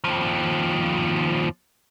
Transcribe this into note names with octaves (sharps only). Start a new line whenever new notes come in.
D#2 F3